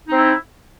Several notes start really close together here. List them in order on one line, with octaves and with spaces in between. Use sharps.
D#4 C4 E4